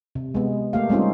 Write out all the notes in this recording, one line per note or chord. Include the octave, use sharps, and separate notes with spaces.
C3
G#3 B3
A3 A#3 G4 F5
G3 G#3 C4 C#4 D#4 F4